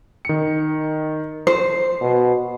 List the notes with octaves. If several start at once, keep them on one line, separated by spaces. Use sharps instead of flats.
D#3 C#7
C5 C7
B2